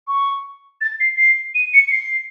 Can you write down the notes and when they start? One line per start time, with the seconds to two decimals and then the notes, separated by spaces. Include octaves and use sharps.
0.07 C#6
0.81 A6
1.00 C7
1.17 C7
1.54 D#7
1.73 C#7
1.87 C#7
1.91 C7